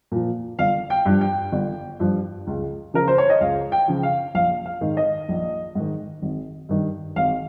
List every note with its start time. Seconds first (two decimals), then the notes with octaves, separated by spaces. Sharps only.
0.12 A#2 F3
0.59 G1 F5
0.90 G5
1.05 G2 F3
1.21 G5
1.52 G1
2.00 G2 F3
2.47 C#2
2.94 C#3 F3 A#4
3.08 C5
3.18 C#5
3.30 D#5
3.41 C#2 F5
3.72 G5
3.88 C#3 F3
4.03 F5
4.35 A#1 F5
4.66 F5
4.81 G#2 D#3
4.97 D#5
5.29 A#1
5.75 G#2 D#3
6.22 G#1
6.69 G2 D#3
7.16 G#1 F5